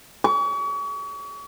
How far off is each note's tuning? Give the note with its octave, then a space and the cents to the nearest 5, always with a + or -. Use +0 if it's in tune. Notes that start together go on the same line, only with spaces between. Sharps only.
C#6 +40